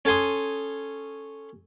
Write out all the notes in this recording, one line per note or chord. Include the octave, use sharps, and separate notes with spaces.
C#4 A4 G#5 C6 D#6